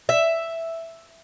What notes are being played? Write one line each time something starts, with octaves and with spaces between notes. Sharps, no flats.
E5